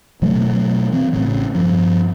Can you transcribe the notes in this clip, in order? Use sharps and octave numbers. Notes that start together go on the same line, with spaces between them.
B2 E3 F#3 A3
E3 C4
A1 A2 C#3
G2 F3